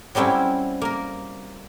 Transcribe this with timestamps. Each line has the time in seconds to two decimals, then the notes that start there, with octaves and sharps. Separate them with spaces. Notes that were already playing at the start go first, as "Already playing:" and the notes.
0.15 F#3 G3 C4 C#4 E4
0.82 A#3 A#4